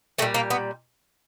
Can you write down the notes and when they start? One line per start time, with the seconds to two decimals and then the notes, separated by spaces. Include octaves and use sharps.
0.18 A#2 A3
0.22 G3
0.34 A#3
0.50 B3